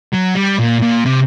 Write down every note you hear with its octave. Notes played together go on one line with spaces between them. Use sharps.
F#3
G3
A#2
A#2
C3